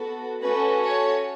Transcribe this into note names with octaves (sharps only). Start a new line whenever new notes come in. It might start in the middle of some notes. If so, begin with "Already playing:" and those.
Already playing: B3 F#4 A4
A3 C#4 F#4 A4 B4
C#5